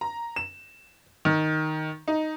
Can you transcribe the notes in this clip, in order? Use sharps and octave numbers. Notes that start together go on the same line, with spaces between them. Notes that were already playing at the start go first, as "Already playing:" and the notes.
A#5
E7
D#3
D#4